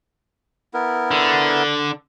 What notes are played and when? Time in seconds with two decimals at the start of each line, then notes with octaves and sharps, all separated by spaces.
0.74 B3 E4 A#4
1.11 D3